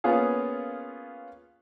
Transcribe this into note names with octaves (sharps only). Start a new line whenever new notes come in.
A#3 B3 C#4 F4 G#4